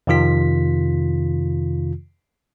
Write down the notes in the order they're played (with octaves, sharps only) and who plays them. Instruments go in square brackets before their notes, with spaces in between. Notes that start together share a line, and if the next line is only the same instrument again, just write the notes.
[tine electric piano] F2 C3 D#3 F4 B6